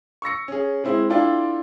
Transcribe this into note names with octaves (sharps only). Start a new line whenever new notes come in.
C#6 E6 A#6 C#7
C#4 G#4
G#3 C4 E4
D4 E4 F4 A4 G5